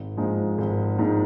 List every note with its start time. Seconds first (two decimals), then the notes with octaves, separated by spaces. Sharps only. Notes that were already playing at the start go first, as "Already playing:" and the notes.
Already playing: G#1
0.17 G#2 F3 G#3 D#4
0.58 G#1
0.99 G#2 F3 G#3 D#4